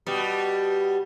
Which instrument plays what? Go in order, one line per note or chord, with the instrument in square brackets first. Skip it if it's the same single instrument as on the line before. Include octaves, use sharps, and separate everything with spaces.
[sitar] B2 G3